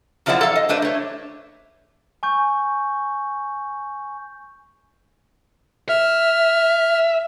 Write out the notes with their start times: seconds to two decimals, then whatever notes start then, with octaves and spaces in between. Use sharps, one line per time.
0.26 F#2 F3 E4 C5 D5 F#5
0.41 A4 F5
0.56 D#5
0.69 A3 D4 B4 C5
0.82 A3 C#5
2.23 G#5 C#6 G6
5.89 E5 F6